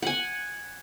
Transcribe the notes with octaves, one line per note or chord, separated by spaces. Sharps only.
F#5 G#5